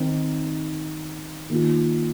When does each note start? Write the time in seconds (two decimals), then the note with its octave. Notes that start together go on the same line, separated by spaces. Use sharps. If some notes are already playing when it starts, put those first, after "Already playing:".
Already playing: D#3 C4 D#4
1.50 D#3 A#3 F4